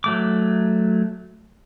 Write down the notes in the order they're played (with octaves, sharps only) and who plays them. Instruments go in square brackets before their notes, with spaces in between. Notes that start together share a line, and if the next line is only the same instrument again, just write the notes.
[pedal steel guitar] F#3 A3 D6